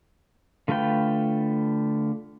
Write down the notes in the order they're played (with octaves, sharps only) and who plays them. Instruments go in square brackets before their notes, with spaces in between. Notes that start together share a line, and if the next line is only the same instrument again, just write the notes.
[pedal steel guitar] D3 A3 F4 B4 G5